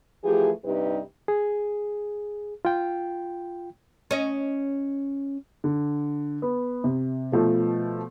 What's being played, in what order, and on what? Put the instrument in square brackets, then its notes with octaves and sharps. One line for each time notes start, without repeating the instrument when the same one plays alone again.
[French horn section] E3 F3 A3 G4 G#4
G2 C3 G3 D#4 G4 B4
[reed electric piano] G#4
F4 G5
[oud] C#4 D#5
[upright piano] D3
B3
C3
B2 F3 A3